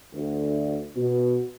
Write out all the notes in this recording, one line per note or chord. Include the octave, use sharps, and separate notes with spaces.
D2
B2